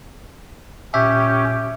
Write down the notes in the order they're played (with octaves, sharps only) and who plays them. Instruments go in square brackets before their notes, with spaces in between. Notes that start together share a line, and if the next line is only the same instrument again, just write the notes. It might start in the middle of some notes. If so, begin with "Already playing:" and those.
[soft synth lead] A#2 [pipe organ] C#4 G4 [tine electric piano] E5